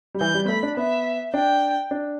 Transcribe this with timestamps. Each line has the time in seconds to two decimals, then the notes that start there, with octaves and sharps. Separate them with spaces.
0.14 G3
0.20 E3 G6
0.34 G3
0.45 B3
0.48 A3 B5
0.63 D4
0.77 B3 E5
1.34 D4 G5
1.91 D4